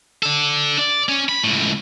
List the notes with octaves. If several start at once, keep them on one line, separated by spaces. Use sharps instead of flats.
D4 A4
D5
C#4
B5
C#2 A2